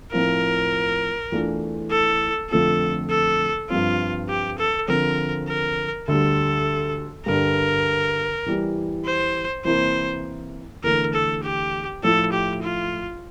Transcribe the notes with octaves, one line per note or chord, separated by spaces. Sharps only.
A2 F3 C4 F4 A#4
E2 E3 A3 D4 F4
A4
F2 D3 A3 C4 F4 A4
A4
G2 F3 C4 F4
G4
A4
D3 F3 C4 A#4
A#4
D2 D3 G3 A4
G2 D3 G3 A#4
E2 E3 G3
C5
C3 E3 A#3 E4 C5
E2 D3 A3 A#4
A4
G4
A2 F3 A3 E4 A4
G4
F4